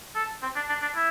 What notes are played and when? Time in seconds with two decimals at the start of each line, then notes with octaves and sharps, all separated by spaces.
0.15 A4
0.42 C4
0.56 D4
0.69 D4
0.82 D4
0.96 E4